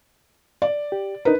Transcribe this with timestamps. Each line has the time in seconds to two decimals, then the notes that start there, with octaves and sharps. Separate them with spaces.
0.62 D5
0.92 G4
1.25 D4 D#4 A#4 B4